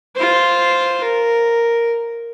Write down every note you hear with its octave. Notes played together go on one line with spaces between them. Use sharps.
F4 C5
A#4